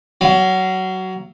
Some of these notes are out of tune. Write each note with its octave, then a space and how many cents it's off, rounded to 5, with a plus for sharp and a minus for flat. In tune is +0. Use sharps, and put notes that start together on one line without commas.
F#3 +20 F5 -25